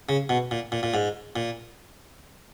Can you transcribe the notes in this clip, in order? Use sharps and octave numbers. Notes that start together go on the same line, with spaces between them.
C#3
B2
A#2
A#2
A#2
G#2
A#2